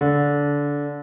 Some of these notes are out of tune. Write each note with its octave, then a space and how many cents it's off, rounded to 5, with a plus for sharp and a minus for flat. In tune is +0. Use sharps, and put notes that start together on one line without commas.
D3 -20